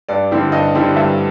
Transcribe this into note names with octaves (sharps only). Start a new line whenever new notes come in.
G2 D5
D3 G3 C4 E4
G2 D#5
D3 G3 C4 E4
G2 E5